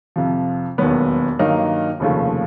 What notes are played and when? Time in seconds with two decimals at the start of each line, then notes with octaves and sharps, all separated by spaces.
0.16 F2 C3 F3
0.78 E1 D#2 D#3 F#3 B3
1.39 G2 D#3 F#3 A#3 D#4
2.00 F1 D#2 C#3 F3 A3